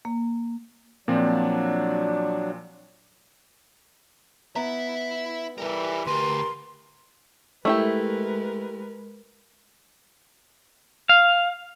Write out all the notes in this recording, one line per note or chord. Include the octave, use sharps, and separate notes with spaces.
A#3
A#2 F3 F#3 C4 D4
B3 E4 E5 A#5
E3 G3 A4 A#4
D2 G4 A#4 B4 G#5 C6
G#3 A3 E4 G4 A#4 B4
F5